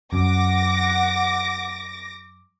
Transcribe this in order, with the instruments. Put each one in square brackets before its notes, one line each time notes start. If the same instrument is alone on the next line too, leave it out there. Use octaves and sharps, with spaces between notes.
[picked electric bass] F#2 [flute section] F#5 [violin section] D6 A#6